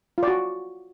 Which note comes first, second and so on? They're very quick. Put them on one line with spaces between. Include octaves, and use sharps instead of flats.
F4 D5 F#4